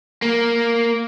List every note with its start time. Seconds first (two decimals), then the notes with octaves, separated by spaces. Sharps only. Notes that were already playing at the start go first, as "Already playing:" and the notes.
0.22 A#3